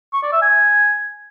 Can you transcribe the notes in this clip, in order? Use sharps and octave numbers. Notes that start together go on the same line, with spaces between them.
C#6
D5
E5
G#5